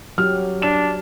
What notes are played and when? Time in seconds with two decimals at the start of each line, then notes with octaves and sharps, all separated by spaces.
0.18 F#3 G4 F6
0.62 D4 E7